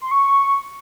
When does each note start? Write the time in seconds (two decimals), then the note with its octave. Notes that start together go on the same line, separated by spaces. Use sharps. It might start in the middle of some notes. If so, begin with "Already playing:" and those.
0.01 C6
0.11 C#6